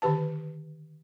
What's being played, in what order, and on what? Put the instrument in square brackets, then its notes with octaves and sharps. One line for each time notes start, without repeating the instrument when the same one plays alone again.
[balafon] D3 D#3 G4 B4 A5